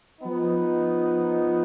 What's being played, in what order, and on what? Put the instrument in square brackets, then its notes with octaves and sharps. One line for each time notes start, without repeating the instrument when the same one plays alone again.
[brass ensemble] F3 B3 D#4